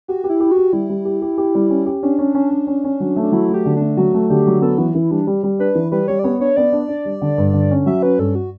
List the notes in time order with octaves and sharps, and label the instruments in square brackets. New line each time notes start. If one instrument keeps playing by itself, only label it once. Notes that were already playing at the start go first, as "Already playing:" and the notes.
[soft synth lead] F#4 [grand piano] G4
[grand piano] G4
[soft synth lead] E4
[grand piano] G4
[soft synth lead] F#4
[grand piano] G4
[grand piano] G3 [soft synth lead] E4
[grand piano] G3
G4
G4
G4
G3
C#4
G4
[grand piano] C#4 [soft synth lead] D4
[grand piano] C#4
C#4
C#4
C#4
C#4
F#3
A3
[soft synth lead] D4
[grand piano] F#3 [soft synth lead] E4
[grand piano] A3
[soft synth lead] G4
[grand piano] D3
[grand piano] A3 [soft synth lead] D4
[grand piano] F#3 [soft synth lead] F#4
[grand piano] A3
[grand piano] D3 [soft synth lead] G4
[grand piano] F#3
[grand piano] B3 [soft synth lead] A4
[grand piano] E3 [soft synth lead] F#4
[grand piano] E3 [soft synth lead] E4
[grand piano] G3 [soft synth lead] D4
[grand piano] G3
G3
[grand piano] D4 [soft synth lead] B4
[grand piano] E3
[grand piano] G3 [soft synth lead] B4
[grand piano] G3 [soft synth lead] C#5
[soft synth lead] D5
[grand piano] B3 [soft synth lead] C#5
[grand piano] D4 [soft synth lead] C#5
[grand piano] B3 [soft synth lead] D5
[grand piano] D4
D4
G3
D3
G2
D3
C#4
[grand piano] F#3 [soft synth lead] E5
[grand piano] C#4 [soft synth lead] B4
[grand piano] G2 [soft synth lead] A4
[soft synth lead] F#4